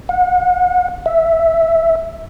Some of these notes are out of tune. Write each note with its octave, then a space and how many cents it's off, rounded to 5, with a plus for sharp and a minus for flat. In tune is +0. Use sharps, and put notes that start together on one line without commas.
F#5 -40
E5 -5